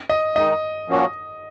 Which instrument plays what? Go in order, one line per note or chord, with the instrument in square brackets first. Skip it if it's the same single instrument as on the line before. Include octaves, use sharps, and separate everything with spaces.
[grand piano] D#5
[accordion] D#3 G#3 D#4 [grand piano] D#5
[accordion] A#2 F3 A#3 C#4 F#4